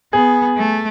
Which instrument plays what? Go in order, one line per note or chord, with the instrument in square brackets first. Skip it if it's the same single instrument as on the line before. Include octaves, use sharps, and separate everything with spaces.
[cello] B3 [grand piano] G#4
[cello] A3